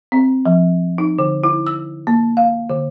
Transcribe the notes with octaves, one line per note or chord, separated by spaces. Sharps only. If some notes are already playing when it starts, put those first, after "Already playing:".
C4
F3
D#4
D3
E4
E6
A#3
F5
D3